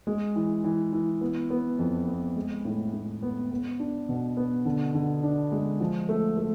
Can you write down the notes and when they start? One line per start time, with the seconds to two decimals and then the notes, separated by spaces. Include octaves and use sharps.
0.07 G#3
0.36 E3
0.64 E3
0.93 E3
1.21 B3
1.50 B3
1.78 F2
2.07 B3
2.36 G#3
2.65 A2
2.93 A2
3.22 B3
3.51 B3
3.79 D4
4.09 B2
4.37 B3
4.65 D3
4.95 D3
5.23 D4
5.52 G#3
5.80 F3
6.09 A3
6.37 A3